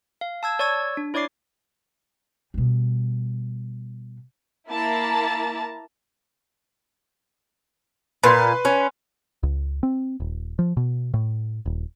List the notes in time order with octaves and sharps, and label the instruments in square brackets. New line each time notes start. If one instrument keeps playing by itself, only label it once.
[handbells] F5
A5 E6 G#6
C#5 D5 C#6 E6 G#6
D4
E4 C#5 D5 D6 C7
[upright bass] B2 G3
[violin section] A#3 E4 A5 A#5
[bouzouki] A#2 [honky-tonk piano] B4 C6
[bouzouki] C#4
[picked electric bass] C#2
C4
D#1
F3
B2
A2
D#1